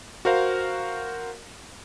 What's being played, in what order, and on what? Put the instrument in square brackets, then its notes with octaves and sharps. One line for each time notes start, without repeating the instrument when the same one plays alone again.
[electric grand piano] F#4 A#4 C5 F5